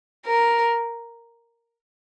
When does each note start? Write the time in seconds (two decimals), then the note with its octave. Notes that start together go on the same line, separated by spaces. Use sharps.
0.26 A#4